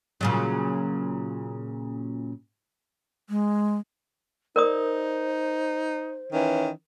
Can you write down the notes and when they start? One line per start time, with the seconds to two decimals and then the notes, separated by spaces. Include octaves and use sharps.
0.21 A#2 C#3 F#3
3.29 G#3
4.56 D#4 A#4 C5 D5 D#6
6.32 D#3 E3 C#4